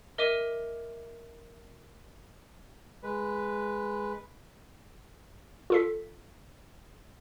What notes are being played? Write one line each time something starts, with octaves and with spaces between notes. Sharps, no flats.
A#4 D#5 E5 D6 D#7
G#3 B4
F4 A4 B6